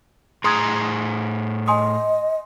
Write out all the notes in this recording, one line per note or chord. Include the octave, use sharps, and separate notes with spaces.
A2 G#4 A#5 C6 D#6 G#6
D#5 G#5 C6 D#6